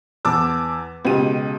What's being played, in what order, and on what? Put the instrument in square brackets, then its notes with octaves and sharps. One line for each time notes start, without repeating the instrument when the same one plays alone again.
[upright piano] E2 A5 D6 E6
C#2 B2 G4 D#7